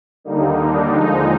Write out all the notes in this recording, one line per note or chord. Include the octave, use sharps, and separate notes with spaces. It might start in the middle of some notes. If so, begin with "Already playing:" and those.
D#2 D3 G3 A#3 D#4
D4
D#2 D3 F3 G#3 D#4